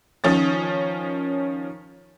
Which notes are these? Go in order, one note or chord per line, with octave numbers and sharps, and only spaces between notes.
D#3 F3 C#4 D#6 A6